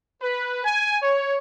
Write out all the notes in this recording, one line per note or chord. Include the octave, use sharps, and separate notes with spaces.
B4
G#5
C#5